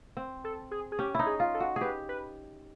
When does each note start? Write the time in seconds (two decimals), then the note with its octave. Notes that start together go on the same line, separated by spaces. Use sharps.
0.17 C4
0.44 A4
0.71 G#4
0.92 G#4
0.99 C#4 G4
1.15 D#4 E4
1.26 G#4
1.40 F4
1.54 A4
1.60 F#4
1.76 G#4
1.81 G4 B4
2.09 B4